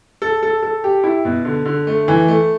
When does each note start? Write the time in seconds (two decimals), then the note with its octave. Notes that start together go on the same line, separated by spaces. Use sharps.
0.22 A4
0.43 A4
0.62 A4
0.84 G4
1.04 E4
1.25 B2
1.45 D3
1.65 D3
1.87 A3
2.08 E3
2.28 A3